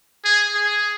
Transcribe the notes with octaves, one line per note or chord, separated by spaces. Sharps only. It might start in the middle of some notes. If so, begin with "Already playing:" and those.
G#4
G#4